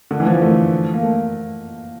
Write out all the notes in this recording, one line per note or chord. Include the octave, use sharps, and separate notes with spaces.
D3
E3
F3
A3
A#3
A3